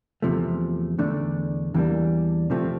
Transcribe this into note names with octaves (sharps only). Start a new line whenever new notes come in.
E2 C3 F3 A3
E2 D3 A3 D4
E2 E3 G3 A#3 D4
C3 F3 A3 C4